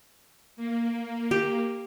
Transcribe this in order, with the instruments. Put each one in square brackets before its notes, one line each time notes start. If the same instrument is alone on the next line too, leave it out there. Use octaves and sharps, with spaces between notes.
[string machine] A#3
[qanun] G4